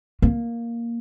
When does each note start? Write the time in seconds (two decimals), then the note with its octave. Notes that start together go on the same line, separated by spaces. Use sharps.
0.22 A#3